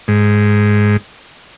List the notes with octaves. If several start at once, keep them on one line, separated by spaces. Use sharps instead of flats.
G#2